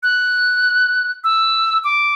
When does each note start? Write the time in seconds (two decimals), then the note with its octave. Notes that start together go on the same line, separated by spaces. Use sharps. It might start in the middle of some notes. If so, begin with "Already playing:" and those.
0.03 F#6
1.24 E6
1.84 D6